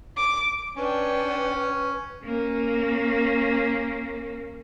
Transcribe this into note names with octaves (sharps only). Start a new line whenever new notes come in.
D6
C#4 D4 B4 G5
A#3 C#4